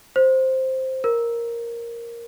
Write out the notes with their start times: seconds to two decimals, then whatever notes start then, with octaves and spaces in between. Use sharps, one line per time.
0.16 C5
1.04 A#4